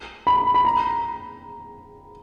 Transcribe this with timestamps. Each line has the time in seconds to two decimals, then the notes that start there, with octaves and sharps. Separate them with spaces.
0.27 B5
0.54 B5
0.65 A#5